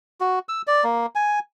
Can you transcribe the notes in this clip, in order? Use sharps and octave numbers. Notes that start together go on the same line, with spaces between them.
F#4
E6
D5
A#3
G#5